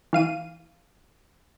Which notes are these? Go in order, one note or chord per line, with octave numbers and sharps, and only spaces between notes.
E3 F5 D#7